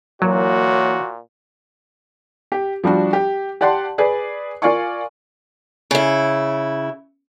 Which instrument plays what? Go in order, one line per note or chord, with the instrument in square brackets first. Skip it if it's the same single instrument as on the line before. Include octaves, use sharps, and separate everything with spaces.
[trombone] A#2 [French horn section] E3 A#3 C#5 [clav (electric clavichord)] F#3 [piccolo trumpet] F#4
[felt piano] G4
F3 G3 D4 F#4
G4
G4 D5 F#5 A5 C6
G#4 B4 D5
F4 A#4 D5 F5 G#5 C#6
[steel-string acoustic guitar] C#3 E4